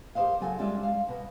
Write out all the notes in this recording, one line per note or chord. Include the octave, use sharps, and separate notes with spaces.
G4 A#4 C5 D#5 F5
C#3 F#3 F4 A4 G#5
G3 G#3 C#4 F4 D5 E5
F5
B2 B4